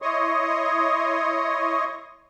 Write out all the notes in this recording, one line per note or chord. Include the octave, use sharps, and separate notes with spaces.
E4 C#5 D#5 C6 C#6 D#6